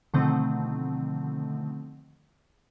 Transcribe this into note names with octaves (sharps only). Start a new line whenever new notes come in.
B2 D3 D#3 F3 A3 C4